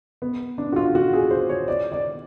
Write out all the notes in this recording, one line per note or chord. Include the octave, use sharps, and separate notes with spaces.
B3
D4
F#4
F4
F#4
G#4
C5
C#5
D5
D5